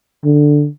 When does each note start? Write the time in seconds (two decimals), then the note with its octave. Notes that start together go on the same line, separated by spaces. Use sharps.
0.24 D3